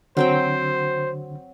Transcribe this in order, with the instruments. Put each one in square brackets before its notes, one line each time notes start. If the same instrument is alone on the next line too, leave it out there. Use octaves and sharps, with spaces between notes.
[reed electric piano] D3 [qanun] F#3 C4 G5 [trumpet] C5